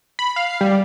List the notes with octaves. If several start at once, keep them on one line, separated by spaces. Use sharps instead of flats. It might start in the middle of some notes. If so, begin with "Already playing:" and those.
B5
F5
G3